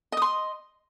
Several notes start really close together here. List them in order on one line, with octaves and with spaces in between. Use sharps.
D#5 D#6 C6